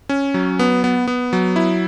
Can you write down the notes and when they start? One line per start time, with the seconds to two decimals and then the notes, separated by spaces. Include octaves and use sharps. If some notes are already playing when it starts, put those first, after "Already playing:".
0.09 C#4
0.34 F#3
0.59 B3
0.84 B3
1.08 B3
1.33 F#3
1.56 E4